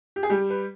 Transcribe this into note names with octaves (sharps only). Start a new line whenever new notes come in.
G4
G#4
G3 G4
B4